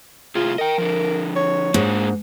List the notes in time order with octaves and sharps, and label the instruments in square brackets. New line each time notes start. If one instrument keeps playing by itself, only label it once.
[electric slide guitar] A2 C3 G#4 [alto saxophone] F4
[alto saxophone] A#4 [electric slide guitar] D#5 G5
[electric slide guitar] D3 F3
[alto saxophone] C#5
[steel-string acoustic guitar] G#2 [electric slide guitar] A#3 D4 G#4